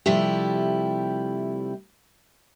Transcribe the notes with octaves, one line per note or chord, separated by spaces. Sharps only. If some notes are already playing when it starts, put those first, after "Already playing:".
C3 F3 G3 A3 E4 G4